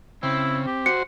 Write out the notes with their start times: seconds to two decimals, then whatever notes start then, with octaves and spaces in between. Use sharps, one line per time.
0.23 C#3 C4 E4
0.67 G4
0.86 F#4 C5 C#7